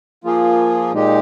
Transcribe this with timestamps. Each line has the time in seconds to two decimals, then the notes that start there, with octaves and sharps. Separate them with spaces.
0.24 F3 A#3 F4 G#4
0.92 A#2 G#3 D#4 G4